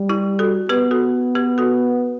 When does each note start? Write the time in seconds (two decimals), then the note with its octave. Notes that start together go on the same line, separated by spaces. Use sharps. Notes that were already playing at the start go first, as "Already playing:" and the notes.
Already playing: G3
0.09 E4 G4
0.39 F#4 A4
0.69 B3 G4 B4
0.91 F#4 A4
1.35 G4 B4
1.58 F#4 A4